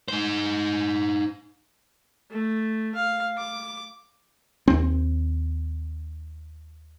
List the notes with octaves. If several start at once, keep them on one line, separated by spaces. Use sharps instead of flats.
D#4 C5
A3
F5
D6
D#2 C4